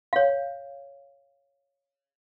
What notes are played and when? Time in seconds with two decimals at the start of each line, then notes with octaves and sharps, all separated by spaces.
0.13 C#5 F5